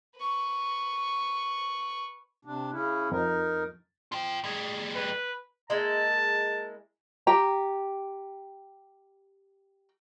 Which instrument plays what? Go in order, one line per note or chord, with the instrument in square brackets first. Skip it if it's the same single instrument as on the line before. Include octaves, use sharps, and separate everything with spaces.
[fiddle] B4 C#6
[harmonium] C3 D4
C#3 C#4 E4
[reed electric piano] F2 [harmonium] D#4 A#4
[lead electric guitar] F4 G5
G3 G#4
[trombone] B4
[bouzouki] G#3 A#3 E4 [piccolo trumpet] A5
[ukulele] G4 G5 A#5